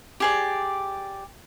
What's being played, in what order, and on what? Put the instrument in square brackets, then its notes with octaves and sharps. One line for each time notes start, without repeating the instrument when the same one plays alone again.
[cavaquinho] G4 G#4 D5